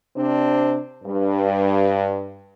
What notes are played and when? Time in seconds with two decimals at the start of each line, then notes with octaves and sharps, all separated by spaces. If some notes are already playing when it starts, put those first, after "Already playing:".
0.16 C3 C4 D4
1.04 G2